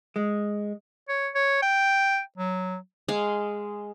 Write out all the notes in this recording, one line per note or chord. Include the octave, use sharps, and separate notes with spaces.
G#3
C#5
C#5
G5
F#3
G#3 F5